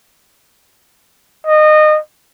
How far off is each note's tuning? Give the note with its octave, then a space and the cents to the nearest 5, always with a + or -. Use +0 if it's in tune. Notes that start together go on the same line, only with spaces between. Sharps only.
D#5 -25